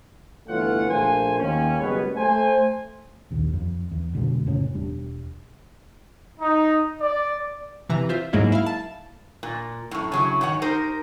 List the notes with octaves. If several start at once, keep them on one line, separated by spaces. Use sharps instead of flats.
G1 E3 A3 F4 C#5 F#5
A#1 A3 A#3 C5 G#5
D#2 C#4
F#1 G3 G#3 B3 B4 C#5
A3 C5 G#5
A#1 D#2
F2
E2
F1 B2 D3 G#3
F1 A2 C#3 C#4
E1 G3 D4
D#4
D5
C3 E3 A#5
F4 C5 E5
G#2 F#3 G#3 A#3 E4
E4 F5
A5
A#2
F#2 A2
C#3 F#3 E4
G#2 D#3 C#5 F#5
D#4 G4 A#4 C5